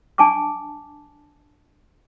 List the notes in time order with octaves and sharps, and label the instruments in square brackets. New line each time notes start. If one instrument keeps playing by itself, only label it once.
[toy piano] D4 G#5 A5 C#6 D6